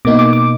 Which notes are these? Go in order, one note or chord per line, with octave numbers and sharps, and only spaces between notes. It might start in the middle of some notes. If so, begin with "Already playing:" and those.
B2 A#3 D#4 D6
D6
D6